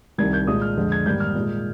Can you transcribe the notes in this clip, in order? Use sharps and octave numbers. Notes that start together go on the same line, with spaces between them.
C2 C3 D#3 G3 G#6
G6
A#2 G#3 D#6
F6
F2 D3 G#3
G#6
G#2 D#3 G3 A#3 G6
F6
A#2 G#3